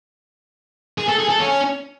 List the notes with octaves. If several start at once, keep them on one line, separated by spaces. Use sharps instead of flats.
G#4
A4
G#4
A4
C#4